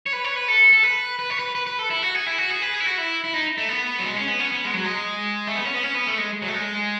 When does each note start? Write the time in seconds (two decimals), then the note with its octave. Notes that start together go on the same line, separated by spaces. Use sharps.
0.06 C#5
0.13 B4
0.24 C#5
0.36 B4
0.48 A4
0.73 A4
0.83 B4
1.19 B4
1.30 C#5
1.39 B4
1.55 B4
1.67 B4
1.79 A4
1.90 E4
2.02 F#4
2.15 G#4
2.26 E4
2.38 F#4
2.50 G#4
2.62 B4
2.74 G#4
2.80 E4
2.86 F#4
2.98 E4
3.24 E4
3.34 D#4
3.58 A3
3.69 B3
3.99 F#3
4.05 G#3
4.17 C#4
4.28 B3
4.40 C#4
4.52 B3
4.65 G#3
4.74 F#3
4.84 G#3
5.47 A3
5.56 B3
5.65 C#4
5.74 B3
5.83 C#4
5.95 B3
6.07 A3
6.18 G#3
6.42 F#3
6.48 A3
6.54 G#3